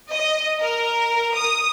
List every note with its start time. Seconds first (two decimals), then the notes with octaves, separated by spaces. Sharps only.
0.11 D#5
0.61 A#4
1.34 D#6